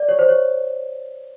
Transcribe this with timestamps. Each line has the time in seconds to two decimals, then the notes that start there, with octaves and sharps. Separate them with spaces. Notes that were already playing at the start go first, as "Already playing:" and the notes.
Already playing: D5
0.09 C#5
0.19 C5
0.29 C#5